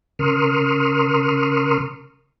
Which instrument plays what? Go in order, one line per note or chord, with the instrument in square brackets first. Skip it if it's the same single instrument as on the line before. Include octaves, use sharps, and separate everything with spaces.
[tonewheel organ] C#3 A#4 C6 C#6 D#6 F6